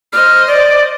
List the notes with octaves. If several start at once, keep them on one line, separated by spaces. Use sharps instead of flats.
C5 D#5 F6
D5